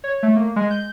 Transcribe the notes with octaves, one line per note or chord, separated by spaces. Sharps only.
C#5
A3
A#3
G#3
G6